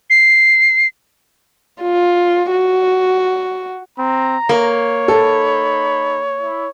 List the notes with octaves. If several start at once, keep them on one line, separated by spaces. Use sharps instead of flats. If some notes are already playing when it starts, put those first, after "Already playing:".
C7
F4
F#4
C4 A#5
A#3 C#5
D#4 A4 B5
E4